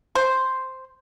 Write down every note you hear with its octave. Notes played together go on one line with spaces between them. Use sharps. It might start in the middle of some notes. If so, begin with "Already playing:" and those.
C5